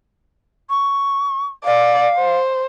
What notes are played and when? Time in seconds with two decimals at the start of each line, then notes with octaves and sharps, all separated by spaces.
0.70 C#6
1.65 D5 F5
2.18 C5